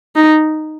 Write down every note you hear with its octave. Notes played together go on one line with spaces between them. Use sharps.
D#4